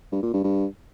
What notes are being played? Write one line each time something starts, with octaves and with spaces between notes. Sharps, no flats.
G2
A#2
G2
G2